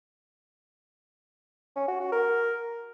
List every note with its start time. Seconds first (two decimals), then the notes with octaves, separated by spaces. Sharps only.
1.76 C#4
1.88 F#4
2.00 F#4
2.12 A#4